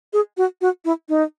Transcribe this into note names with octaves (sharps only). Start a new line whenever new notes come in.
G#4
F#4
F#4
E4
D#4